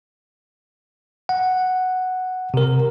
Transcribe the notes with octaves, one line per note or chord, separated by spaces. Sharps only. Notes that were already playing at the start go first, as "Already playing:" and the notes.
F#5
C3 A#4